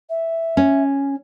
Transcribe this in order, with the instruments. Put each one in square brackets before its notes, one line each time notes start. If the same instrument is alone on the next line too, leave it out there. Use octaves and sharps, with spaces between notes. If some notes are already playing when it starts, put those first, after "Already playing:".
[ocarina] E5
[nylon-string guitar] C#4